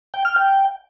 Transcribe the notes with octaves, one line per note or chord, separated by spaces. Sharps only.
G5
F6
G5